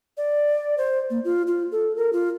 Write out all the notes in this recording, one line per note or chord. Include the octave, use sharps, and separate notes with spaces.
D5
C5
A#3
F4
F4
A4
A#4
F4